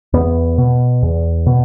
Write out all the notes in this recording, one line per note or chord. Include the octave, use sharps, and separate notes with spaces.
E2 B3
B2
E2
B2